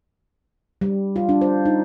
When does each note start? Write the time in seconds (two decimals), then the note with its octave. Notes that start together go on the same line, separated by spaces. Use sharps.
0.81 G3
1.16 F4
1.29 D4
1.41 C5
1.65 D#4